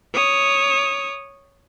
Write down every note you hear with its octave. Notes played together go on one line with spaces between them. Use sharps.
C#5 D#6